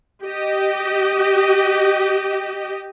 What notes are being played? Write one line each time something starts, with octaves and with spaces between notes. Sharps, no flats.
G4 D#5